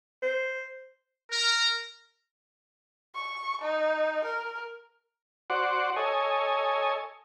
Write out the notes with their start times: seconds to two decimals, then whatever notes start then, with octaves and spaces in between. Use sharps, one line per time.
0.22 C5
1.31 A#4
3.15 C#6
3.62 D#4
4.25 A#4
5.50 F#4 C5 D5 F#5
5.96 A4 C#5 D#5 G#5